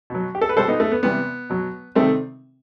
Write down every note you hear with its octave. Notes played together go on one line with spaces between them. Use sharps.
B2 F#3
G4
A4
B4
B2 G3 A4 C5
B3 D#4
A3
B3
C3 E3 G3 B3
B2 F#3
C3 D#3 G3 A3 C4